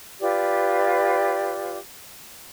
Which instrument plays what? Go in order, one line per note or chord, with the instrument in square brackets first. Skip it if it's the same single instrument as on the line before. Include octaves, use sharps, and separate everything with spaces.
[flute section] F4 G4 B4 D5